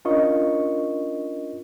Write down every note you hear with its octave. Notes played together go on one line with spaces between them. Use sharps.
C#4 D4 F4 A#4 D#5 C#6